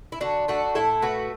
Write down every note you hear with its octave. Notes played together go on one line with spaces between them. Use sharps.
E4
D3 D4 F#4
A3 D4 F#4
A2 E4 A4
A3 F#4 B4